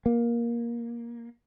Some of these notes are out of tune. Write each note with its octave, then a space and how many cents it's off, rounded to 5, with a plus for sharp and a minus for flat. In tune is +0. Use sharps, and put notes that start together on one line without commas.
A#3 +15